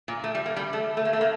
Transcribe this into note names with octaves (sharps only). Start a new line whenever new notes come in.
A#2
A3
G3
A#3
G3
A3
A3
A#3
A3
A#3